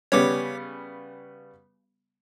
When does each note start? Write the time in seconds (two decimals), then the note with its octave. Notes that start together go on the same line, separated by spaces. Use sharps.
0.12 C#3 G3 B3 C#5 D6